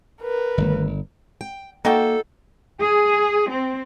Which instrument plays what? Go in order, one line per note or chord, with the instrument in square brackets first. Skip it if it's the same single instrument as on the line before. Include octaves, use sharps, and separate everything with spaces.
[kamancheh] A#4 B4
[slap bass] G1 [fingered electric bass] D#3 A3
[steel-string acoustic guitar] G5
[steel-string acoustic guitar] A#3 [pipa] D#4 F#4 G5 [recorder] A4
[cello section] G#4
C4